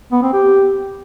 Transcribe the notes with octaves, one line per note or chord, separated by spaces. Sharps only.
B3
C4
G4